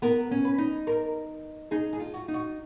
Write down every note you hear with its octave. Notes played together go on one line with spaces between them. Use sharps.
B3 A#4
C#4
B4
D#4
A#4
D#4 G#4
G#4
F4
F#4
D#4
F#4